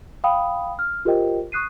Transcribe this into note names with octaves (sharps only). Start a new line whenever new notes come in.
F5 G5 B5 D#6
F6
F4 G4 A#4 C5 D#5 G5
C#6 D#6 F#6 C7 D#7